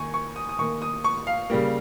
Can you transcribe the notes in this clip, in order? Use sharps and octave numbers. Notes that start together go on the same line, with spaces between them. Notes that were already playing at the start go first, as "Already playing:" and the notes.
Already playing: D#3 A#3 G#5 C#6
C#6
D#6
D#6
D#3 A#3 C#6
D#6
C#6
F5
C#3 G3 A#3